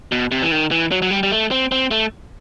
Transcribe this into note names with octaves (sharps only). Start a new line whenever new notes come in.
B2
C3
E3
D#3
E3
F#3
F#3
G3
G3
A3
C4
C4
A3